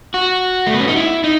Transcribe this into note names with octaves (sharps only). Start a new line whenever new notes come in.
F#4
A3
B3
C#4
D#4
E4
D#4